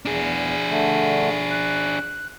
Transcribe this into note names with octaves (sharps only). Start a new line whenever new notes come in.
E2 D4 G#4
D3 A3
F#6